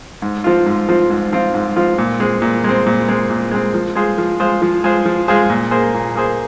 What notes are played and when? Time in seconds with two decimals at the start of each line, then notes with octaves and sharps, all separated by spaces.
0.22 G#2
0.44 F3 C4 F4
0.66 G#2
0.89 F3 C4 F4
1.10 G#2
1.32 F3 C4 F4
1.54 G#2
1.76 F3 C4 F4
1.98 A#2
2.20 G#3 C4
2.42 A#2
2.64 G#3 C4
2.86 A#2
3.08 G#3 C4
3.30 A#2
3.51 G#3 C4
3.74 F3
3.95 G#3 F4 G#4 C5
4.18 F3
4.40 G#3 F4 G#4 C5
4.62 F3
4.84 G#3 F4 G#4 C5
5.06 F3
5.28 G#3 F4 G#4 C5
5.50 A#2
5.71 A#3 G#4 C5
5.94 A#2
6.15 A#3 G#4 C5